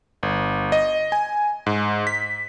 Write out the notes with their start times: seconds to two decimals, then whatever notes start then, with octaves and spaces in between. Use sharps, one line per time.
0.23 G1
0.72 D#5
1.12 G#5
1.66 G#2
2.07 B6